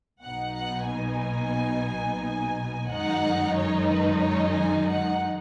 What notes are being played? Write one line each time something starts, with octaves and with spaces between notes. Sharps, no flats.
B1 B2 B3 D#4 F#5
F#5
G#5
F#2 D#3 G#3 D#4 F#5
C#5
B4
C#5
G#5
F#5